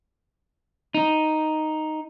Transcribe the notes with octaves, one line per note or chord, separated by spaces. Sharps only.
D#4